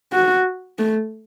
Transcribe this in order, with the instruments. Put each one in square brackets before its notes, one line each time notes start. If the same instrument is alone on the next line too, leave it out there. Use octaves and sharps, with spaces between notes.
[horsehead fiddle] F#4
A3